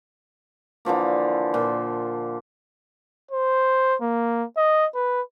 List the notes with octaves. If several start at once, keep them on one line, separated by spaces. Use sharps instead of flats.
D3 E3 F3 A#3
A#2
C5
A#3
D#5
B4